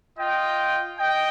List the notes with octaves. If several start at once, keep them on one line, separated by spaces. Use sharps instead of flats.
F4 D#5 G5
D#5 G5